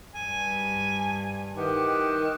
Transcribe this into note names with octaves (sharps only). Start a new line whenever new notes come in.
G2 G#5
D#3 E3 G4 F#5